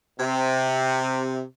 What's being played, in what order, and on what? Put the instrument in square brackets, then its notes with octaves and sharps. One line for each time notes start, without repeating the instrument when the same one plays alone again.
[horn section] C3